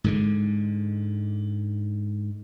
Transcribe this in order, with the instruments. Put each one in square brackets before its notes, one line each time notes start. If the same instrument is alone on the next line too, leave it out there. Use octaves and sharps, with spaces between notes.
[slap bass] G#2 D3 G#3